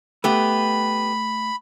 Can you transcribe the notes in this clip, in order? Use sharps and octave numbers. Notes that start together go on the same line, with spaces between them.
A3 B3 G4 B5